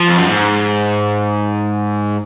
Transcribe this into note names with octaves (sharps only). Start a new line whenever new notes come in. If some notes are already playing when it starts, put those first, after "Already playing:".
Already playing: F3
F2
F#2
G#2